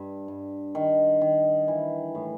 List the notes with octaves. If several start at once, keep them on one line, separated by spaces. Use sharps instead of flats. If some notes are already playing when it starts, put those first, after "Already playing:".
Already playing: G2
G2
D#3
D#3
E3
A2